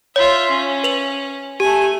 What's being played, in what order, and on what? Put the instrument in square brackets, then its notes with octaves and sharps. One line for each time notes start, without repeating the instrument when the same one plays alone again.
[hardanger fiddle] F4 E5 [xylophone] C#5
[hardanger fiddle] C#4
[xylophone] B4 F7 F#7
[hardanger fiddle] A3 G#5 [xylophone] G4